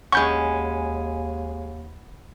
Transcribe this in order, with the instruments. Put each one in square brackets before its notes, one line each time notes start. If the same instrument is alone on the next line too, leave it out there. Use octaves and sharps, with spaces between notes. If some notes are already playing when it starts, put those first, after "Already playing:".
[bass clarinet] D#2 [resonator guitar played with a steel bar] G#3 C#4 [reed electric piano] F#5 B5 [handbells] C#6 G6